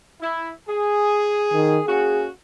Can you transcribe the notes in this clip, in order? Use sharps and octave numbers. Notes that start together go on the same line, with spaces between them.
E4
G#4
D#3
A#3 C#4 F#4 G#4